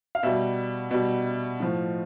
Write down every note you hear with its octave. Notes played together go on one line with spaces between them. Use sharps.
F5
B2 G3 E5
B2 G3
A2 F3